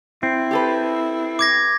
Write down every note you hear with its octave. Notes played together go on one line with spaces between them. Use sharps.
C4 E4
G4 A4 B4
D6 G#6 A#6